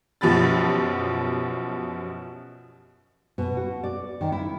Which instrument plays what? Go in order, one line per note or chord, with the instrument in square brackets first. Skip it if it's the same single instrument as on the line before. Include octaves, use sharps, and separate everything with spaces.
[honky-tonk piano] F#2 B2 F3 G4 B5 A6
[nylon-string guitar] B2
F#4
D5
D#3
E4